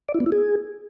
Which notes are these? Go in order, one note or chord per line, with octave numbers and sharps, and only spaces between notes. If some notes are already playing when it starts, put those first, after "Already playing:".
D5
E4
B3
E4
G#4